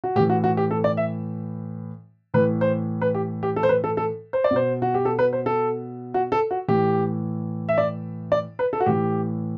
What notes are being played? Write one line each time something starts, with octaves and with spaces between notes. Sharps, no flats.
F#4
A2 E3 G4
F#4
F#4
G4
A4
D5
E5
A2 E3 B4
C5
B4
G4
G4
A4
C5
B4
A4
A4
C5
D5
B2
C5
F#4
G4
A4
B4
C5
A4
F#4
A4
F#4
A2 E3 G4
E5
D5
D5
B4
A4
F#4
A2 E3 G4